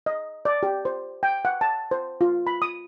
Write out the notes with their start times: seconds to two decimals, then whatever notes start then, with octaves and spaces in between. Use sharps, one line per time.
0.06 D#5
0.45 D5
0.63 G4
0.85 C5
1.23 G5
1.45 F#5
1.61 A5
1.91 C5
2.21 F4
2.47 B5
2.62 D#6